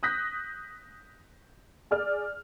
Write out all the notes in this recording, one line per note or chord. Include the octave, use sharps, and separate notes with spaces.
D#6 F#6 G6 A#6 B6
G#4 D5 F6